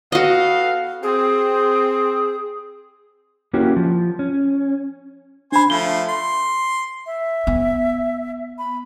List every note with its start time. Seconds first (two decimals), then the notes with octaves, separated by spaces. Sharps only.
0.12 B3 F#4 A4 D#5 F5
1.03 C4 G#4
3.54 A#3 C#4 E4 F#4 G4
3.76 F3
4.19 C#4
5.52 D4 C5 G#5 B5 C6
5.70 F3 A3 G7
6.09 C6
7.06 E5
7.47 B3
8.58 B5